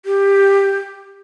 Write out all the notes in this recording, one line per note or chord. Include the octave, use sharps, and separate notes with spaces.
G4